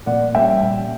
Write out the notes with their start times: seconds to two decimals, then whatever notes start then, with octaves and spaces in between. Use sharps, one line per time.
0.06 A#2 D5 F#5
0.35 G3 A#3 C#4 E5 G5
0.63 A#2